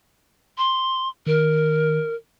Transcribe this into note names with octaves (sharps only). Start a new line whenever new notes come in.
C6
D#3 A#4